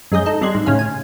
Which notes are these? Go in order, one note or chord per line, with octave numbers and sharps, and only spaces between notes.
F#2 G#3 G#4 D#5 G6
D#4 A4
C3 G3 G#3 C6 F#6 G#6
G#2
A2 C#3 C#4 F5
G#5